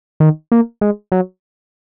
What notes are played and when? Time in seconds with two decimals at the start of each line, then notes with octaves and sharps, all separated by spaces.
0.20 D#3
0.52 A#3
0.81 G#3
1.12 F#3